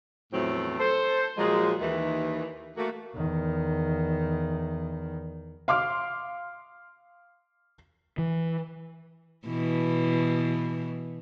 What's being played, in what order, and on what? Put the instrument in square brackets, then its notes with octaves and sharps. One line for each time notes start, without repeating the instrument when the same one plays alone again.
[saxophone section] E2 A2 F3 F#3 A3 C4
A4 C5
A#2 F3 F#3 G#3
D#2 D#3 E3
A3 A#3 F#4
[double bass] E2 D#3
[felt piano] F5 C6 D6 F6
[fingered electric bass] E3
[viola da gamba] B2 E3